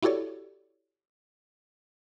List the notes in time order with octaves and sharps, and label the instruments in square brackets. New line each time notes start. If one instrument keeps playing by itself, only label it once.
[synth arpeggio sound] E4 F#4 G4 A4 C#5 D5